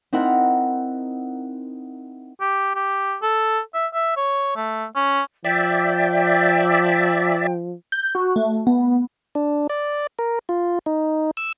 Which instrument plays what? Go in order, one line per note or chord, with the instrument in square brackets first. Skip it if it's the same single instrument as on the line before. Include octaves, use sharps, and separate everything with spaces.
[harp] C4 D#4 E4 A#4 F#5 A#5
[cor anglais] G4
G4
A4
E5
E5
C#5
A3
C#4
[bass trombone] F3 [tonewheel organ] D5 E5 [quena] G5
[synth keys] G6
F#4
A3
B3
[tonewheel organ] D4
D5
A#4
F4
D#4
E6